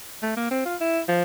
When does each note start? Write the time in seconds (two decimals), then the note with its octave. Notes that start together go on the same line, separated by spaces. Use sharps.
0.23 A3
0.37 A#3
0.51 C4
0.65 F4
0.81 E4
1.08 F3